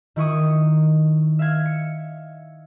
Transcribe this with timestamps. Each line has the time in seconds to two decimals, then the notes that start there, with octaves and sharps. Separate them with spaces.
0.16 D#3 E4 C#6 D#6
1.39 E5 F5 G#6
1.66 C#7